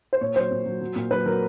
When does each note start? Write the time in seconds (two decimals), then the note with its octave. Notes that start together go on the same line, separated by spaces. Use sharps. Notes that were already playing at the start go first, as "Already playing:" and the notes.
0.13 C5
0.21 A#2 C#5
0.36 F#3 C5
0.51 A#2
0.66 F#3
0.81 F#3
0.96 A#2
1.11 F#3 B4
1.26 F#3 A#4